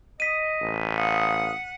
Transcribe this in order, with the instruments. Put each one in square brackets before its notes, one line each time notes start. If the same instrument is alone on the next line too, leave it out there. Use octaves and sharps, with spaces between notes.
[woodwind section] D#5 [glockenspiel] B6 D#7
[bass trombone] A1
[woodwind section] F5 D#6 [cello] F#5